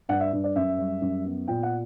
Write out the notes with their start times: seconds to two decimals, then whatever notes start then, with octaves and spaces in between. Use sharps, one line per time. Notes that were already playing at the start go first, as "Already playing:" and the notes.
0.09 G2 F#5
0.20 E5
0.33 G2
0.44 D5
0.56 F#2 E5
0.78 G3
1.01 F#2
1.25 B3
1.48 A#2 G5
1.63 F#5